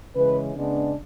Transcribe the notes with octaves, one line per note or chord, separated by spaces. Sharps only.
C#3 E3 G#3 C#4 B4
C#3 G#3 B3 D4